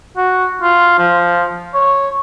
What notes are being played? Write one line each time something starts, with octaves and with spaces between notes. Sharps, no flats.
F#4
F4
F3
C#5